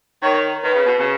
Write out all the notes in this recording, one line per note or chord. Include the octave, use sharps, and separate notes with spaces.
D#3 C#5
D#3 B4
C#3
B2
C#3